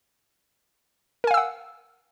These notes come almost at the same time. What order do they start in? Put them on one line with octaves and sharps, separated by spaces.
A#4 G#5 F5 E6 F#5